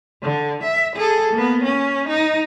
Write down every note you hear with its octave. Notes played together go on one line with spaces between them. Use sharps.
D3
E5
G#4 A4
A#3 B3
C#4
D#4